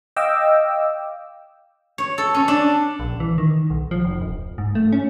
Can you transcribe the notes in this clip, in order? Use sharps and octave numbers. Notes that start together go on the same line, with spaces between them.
D#5 F5 G5 D6 E6
C#5
A4
C#4
D4
A#1
E3
D#3
B1
F3
F1
D1
G#2
A3
C#4